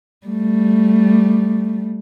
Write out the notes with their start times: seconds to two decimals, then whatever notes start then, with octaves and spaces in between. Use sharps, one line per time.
0.27 G3 A3